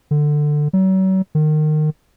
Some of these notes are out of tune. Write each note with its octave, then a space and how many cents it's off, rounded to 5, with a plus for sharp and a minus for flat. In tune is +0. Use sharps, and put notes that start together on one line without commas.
D3 +15
F#3 +40
D#3 -25